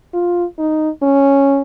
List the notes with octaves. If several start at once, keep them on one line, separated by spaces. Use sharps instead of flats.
F4
D#4
C#4